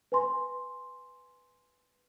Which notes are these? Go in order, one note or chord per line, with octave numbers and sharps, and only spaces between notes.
B4 G#5 C6